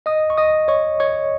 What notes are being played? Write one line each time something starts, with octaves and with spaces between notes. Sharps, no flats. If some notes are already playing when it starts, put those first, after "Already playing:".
D#5 D#6
C#6
D#5 D#6
C#5 C#6
C#5 C#6